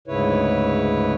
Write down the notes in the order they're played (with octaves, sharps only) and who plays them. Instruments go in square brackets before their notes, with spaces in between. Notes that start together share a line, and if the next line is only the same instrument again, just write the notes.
[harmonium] D2 G#2 C#3 E4 B4 C#5